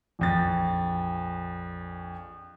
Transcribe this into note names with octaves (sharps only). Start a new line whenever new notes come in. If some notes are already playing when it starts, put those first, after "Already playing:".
A#1 F2 A6